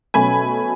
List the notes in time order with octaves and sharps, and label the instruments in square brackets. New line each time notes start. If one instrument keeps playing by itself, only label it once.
[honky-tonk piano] B2 F#3 A3 C#4 G#5 B5